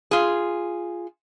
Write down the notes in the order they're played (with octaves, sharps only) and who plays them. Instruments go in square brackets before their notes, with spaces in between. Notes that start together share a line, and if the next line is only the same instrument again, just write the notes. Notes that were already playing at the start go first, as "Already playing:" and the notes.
[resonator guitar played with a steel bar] F4 G#4